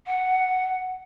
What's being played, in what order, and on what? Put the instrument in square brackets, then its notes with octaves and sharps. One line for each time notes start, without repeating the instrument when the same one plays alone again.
[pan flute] F#5